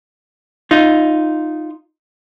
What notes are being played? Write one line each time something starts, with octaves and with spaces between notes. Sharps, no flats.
D#4 F4